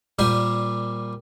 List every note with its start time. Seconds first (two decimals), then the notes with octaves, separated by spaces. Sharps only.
0.19 A#2 G3 G4 C5 G#5 C6